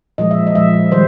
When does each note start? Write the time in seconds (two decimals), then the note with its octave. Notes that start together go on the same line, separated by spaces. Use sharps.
0.18 A#2 F3 G#3 D#5
0.31 E5
0.47 D#5
0.55 A#2 F3 G#3 E5
0.91 D#3 G3 C5